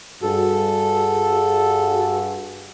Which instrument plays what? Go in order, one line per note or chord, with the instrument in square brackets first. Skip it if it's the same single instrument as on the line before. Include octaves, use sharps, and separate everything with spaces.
[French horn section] G2 F#4 G#4 [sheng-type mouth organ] A4